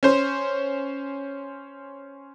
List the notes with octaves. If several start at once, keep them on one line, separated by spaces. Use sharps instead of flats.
C#4 C5